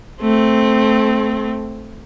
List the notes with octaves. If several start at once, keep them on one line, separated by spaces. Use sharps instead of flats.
A3 C4